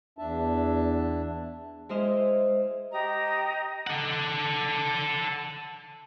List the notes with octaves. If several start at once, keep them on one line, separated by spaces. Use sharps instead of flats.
E2 D4 E5 A5
G#3 E4 C5 D#5 F6
G4 D#5 A#5
A4 F#5